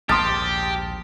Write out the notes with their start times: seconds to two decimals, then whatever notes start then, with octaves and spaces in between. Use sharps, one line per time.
0.09 A#1 D#2 G#2 G4 A5 C6 D#6 F6